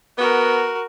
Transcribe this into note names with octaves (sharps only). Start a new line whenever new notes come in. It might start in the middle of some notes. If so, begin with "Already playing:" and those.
B3 F#4 A#4